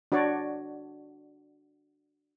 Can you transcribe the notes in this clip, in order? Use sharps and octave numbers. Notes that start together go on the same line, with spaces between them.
D4 F#4 C#5 D5